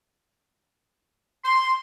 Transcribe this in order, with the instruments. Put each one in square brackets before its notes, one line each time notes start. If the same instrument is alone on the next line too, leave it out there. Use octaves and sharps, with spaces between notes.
[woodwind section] C6